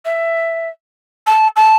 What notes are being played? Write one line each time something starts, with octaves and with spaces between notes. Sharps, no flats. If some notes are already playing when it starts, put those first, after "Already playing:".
E5
A5
A5